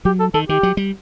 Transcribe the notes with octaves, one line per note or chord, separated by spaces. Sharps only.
F#3 G4
A4
D#3 A4
D#3 G4
F#3
G3